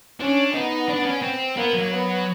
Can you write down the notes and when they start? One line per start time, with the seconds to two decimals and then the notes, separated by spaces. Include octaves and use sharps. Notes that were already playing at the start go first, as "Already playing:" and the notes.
0.20 C#4 D4
0.54 B3 D#4
0.88 D4
1.05 C#4
1.23 C4
1.57 A#3 B3
1.74 F#3
1.92 B3